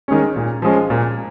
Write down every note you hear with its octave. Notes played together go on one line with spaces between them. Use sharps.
D#3 G#3 C#4
A#2
F3 G#3 C#4
A#2